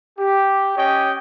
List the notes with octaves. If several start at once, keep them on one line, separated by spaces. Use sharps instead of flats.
G4
C#4 G4 C#5 D#5 G5